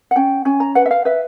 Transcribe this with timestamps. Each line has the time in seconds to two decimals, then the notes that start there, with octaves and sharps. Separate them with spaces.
0.11 F#5
0.16 C#4 G5
0.45 C#4 G#5
0.60 A#5
0.75 B4 F#5
0.86 E5
0.91 F5
1.05 B4 E5